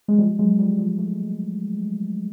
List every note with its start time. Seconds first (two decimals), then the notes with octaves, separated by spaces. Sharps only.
0.08 G#3
0.18 F3 G3
0.39 F#3 G#3
0.59 F3 G3
0.79 F3 G3
0.98 G3 A3